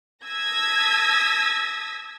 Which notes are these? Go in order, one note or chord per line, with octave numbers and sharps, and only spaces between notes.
A5 D#6 E6 G#6 A#6 B6